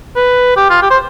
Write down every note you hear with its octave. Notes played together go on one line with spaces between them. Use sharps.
B4
G4
F4
G4
C5